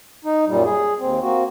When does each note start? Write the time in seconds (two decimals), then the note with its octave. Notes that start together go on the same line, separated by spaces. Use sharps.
0.25 D#4
0.47 F#2 A#2 G3
0.65 G#4
0.99 D#2 C4
1.21 A#3 C4 F#4